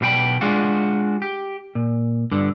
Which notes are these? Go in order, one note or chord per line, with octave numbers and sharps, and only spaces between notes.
B1 B2 D4 G5 B5
G#3 D4 F4 F#4
G4
A#2
G2 D3